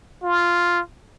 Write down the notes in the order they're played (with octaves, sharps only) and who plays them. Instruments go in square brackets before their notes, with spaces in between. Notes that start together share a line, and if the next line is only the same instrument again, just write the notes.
[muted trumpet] F4